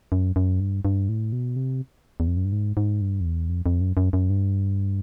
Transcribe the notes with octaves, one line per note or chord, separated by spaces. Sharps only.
F#2
F#2
G2
G2
A2
B2
C3
E2
F2
F#2
G2
G#2
G#2
G2
F2
E2
F2
F2
F#2
F#2
F#2
G2